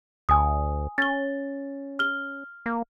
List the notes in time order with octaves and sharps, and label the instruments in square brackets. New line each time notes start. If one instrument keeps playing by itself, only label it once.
[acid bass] D2 [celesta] G#5 D#6
[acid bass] C#4 [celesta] A6 G7
[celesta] F6 G7
[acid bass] A#3